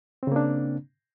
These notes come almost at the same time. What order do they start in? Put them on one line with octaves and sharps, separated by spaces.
C4 C#3 A#3 D4